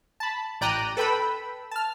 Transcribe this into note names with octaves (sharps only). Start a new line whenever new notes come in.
A5 B5
A1 D5 G5 A#5 F#6 D#7
A4 B4 G5 B5 E6
A5 F6